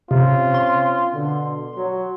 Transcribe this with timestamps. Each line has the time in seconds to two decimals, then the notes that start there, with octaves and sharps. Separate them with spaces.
0.11 C3 C4 C#4 F4
0.54 C6
1.14 B2 D3
1.76 F#3